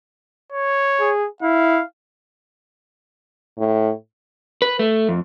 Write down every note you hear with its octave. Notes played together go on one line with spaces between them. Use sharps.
C#5
G#4
E4 F5
A2
B4
A3
F2